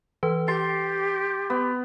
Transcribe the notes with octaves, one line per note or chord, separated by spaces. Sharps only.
E3 B4
G4 C6 A6
B3